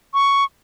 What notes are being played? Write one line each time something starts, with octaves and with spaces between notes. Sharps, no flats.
C#6